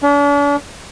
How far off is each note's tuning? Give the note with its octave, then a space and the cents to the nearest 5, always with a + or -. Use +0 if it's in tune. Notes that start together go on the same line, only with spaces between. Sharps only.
D4 -45